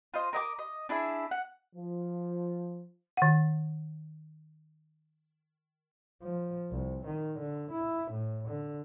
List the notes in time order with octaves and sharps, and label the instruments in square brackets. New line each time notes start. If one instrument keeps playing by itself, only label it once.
[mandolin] F4 C5 D#5
A#4 D#5 G5 D6
D#5
D4 E4 G#4 E5
F#5
[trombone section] F3
[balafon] D#3 F#5
[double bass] F3
C2
D#3
D3
E4
A2
D3